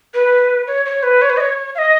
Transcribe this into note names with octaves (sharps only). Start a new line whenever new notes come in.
B4
C#5
C#5
B4
C#5
B4
D#5
C#5
F5
D#5